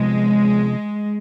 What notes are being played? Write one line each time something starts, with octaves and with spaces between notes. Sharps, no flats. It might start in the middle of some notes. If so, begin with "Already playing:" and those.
Already playing: C3 F3 G#3 B3 F4